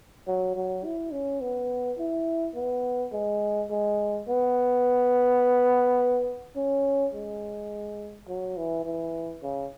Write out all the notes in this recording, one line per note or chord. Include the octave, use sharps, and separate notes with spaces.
F#3
F#3
E4
C#4
B3
E4
B3
G#3
G#3
B3
C#4
G#3
F#3
E3
E3
C#3